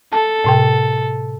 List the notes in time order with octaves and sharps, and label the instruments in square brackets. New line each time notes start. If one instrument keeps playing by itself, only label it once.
[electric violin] A4 [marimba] A5
[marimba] A2 C3 G5